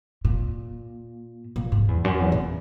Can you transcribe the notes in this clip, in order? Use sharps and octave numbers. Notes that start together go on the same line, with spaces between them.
A#2
A#2
G#2
E2
F#2
E2
A#2